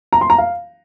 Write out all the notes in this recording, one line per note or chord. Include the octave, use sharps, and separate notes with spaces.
A#5
C6
A#5
F5